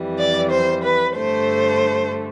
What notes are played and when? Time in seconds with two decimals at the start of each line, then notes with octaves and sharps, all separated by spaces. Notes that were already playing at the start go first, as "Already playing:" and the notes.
Already playing: F2 E3 G3
0.18 D5
0.51 C5
0.83 B4
1.17 G2 D3 A3 C5